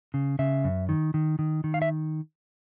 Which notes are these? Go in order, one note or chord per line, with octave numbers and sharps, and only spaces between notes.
C#3
C#3 E5
F#2
D#3
D#3
D#3
D#3
F5
E5